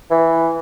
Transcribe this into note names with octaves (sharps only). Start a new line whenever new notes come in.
E3